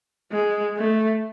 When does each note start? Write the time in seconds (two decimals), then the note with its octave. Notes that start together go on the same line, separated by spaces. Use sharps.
0.32 G#3
0.77 A3